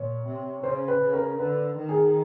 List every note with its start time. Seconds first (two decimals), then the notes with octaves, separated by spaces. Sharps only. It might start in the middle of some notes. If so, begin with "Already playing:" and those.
Already playing: A#2 C#5
0.26 C3
0.63 C#3 C5
0.88 B4
1.01 C#3
1.13 A#4
1.39 D3 B4
1.77 D#3
1.89 G#4